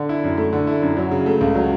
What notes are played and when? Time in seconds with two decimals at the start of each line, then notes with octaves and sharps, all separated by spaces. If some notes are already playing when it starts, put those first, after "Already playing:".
Already playing: D3
0.09 E4
0.24 F#2
0.37 A3
0.53 D3
0.67 E4
0.82 F#2
0.97 F#3
1.11 C#3
1.26 A3
1.41 C#2
1.55 F#3